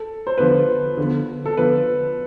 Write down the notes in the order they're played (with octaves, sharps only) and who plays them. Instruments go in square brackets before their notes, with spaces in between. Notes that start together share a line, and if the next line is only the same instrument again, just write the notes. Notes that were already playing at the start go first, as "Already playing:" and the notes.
Already playing: [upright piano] A4
C5
[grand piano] D3 F3 B3 [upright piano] B4
[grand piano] D3 F3 B3
[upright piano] A4
[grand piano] D3 F3 B3 [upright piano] B4